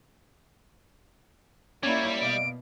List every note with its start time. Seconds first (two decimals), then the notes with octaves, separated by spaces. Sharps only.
1.83 G3 A#3 C#4 E4 C#5 D5 G#6
2.21 B2 D5 D#5 F5 D7